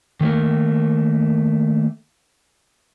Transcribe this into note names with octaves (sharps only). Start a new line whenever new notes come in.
D#3 A3 A#3 A#4